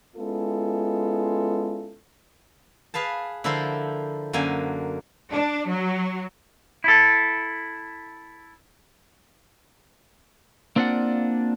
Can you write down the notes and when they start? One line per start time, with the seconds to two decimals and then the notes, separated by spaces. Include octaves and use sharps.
0.16 G#3 B3 C#4 E4 F4 A4
2.94 G#4 B4 F5 A5
3.44 D3 F3 E4 A4 A#4 C5
4.33 F#2 D3 A#3 G#5
5.31 D4
5.67 F#3
6.84 E4 A4
10.76 A#3 C4 D4 F4 D5 F#5